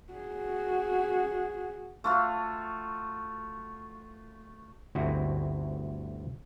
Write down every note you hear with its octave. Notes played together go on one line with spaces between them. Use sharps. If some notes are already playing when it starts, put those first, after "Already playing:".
F#4 G#4
A3 F4 F#4
G1 D2 D3 C4 E4 F#4